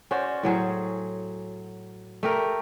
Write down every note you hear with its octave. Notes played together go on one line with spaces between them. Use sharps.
C#4 F#4 C5 D5
A2 F#3 G#4 C5
A3 G4 A#4